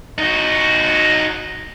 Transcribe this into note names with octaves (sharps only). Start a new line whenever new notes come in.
D#4 F#4